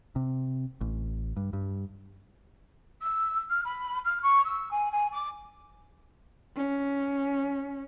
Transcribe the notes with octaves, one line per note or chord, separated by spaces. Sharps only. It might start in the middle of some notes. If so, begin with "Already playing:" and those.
C3
A1
G2
G2
E6
F6
B5
F6
C#6
E6
G#5
G#5
D6
C#4